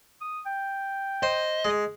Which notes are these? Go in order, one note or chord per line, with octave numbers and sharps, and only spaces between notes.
D#6
G5
C5 D#5
G#3